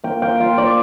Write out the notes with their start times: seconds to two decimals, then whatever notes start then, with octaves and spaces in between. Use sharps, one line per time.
0.04 A#3 G5
0.22 G5
0.40 F4 F5
0.58 D5